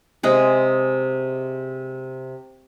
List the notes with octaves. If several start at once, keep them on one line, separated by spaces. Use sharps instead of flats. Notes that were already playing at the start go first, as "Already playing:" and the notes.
C3 G#3 G#4